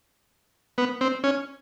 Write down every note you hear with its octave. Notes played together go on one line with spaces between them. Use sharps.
B3
C4
C#4